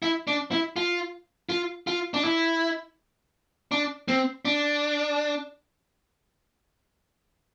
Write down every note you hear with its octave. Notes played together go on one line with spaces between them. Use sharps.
E4
D4
E4
F4
F4
F4
D4
E4
D4
C4
D4